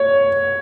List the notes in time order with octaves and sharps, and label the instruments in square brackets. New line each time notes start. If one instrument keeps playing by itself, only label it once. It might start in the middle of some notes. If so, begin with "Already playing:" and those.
Already playing: [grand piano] C#5